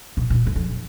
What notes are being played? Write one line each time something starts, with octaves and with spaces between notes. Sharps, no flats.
B2
A#2
F#2
F2